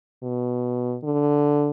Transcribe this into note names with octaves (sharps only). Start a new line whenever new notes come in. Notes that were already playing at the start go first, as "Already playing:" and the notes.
B2
D3